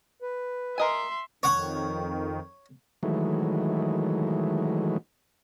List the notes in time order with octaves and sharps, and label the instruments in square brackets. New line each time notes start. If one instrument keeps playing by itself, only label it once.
[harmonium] B4
[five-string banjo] A#4 D#5 G#5 [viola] E5 C6
[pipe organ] F2 D#3 [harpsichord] C#5 F#5 C#6
[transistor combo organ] D#3 E3 F#3 G#3 A3